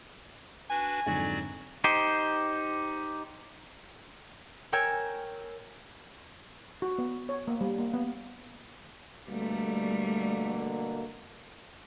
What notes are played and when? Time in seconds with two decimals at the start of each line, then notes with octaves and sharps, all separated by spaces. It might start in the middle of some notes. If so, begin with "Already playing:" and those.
0.70 D4 F#4 B4 G#5
1.06 F2 G#2 D3 F#3 F#4 D5
1.84 D#4 G4 C5
4.72 A#4 C#5 G5 G#5 E6 G#6
6.82 F#4
6.98 B3
7.29 C#5
7.48 A#3
7.61 G3
7.78 A#3
7.94 B3
9.27 B2 D3 G3 A3 A#3